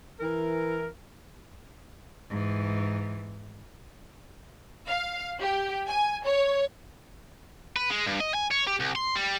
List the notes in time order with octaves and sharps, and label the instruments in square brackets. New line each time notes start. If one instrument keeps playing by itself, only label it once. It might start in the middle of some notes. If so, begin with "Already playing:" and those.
[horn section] E3 A#4
[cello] G#2 E3
[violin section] F5
G4
G#5
C#5
[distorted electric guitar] B4
G#3
G2
D#5
G#5
C#5
G4
C2
C6
G3